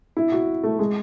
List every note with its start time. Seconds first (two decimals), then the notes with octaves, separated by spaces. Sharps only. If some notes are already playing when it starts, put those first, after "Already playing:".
0.17 E4
0.32 F#4
0.64 A3
0.79 G#3